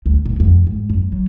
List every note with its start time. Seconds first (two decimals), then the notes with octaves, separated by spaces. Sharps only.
0.06 D2
0.26 B2
0.40 F2
0.67 G#2
0.90 F#2
1.12 F#3